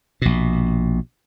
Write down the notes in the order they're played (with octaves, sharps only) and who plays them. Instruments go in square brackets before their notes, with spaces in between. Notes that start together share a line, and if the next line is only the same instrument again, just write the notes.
[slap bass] A#1 B2